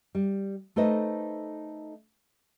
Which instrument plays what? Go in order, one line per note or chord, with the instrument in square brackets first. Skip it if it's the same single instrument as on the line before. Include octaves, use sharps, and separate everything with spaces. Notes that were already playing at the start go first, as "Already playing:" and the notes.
[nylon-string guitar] G3
A3 D#4 A4 B4 C5 D#5